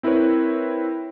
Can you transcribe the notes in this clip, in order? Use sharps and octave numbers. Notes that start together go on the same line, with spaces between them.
C4 E4 A#4 B4 C#5